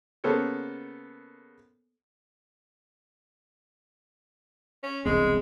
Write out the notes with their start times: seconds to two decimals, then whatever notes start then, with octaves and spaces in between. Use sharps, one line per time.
0.24 C#3 A#3 B3 A4 C5 C#5
4.83 C#4
5.06 E1 C2 G#3 C4